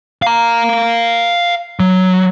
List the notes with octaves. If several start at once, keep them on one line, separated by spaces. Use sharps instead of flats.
F5 A#5
F#3